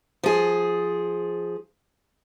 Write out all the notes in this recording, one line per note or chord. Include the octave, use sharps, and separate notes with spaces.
F3 G#4